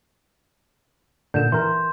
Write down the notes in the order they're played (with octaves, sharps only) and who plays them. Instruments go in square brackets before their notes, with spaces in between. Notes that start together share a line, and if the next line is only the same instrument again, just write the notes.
[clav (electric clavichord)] A#2 D3 [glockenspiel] G6 E7
[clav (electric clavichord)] E3 A#4 [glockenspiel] C6